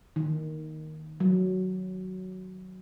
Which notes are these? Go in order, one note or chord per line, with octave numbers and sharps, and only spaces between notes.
D#3
F#3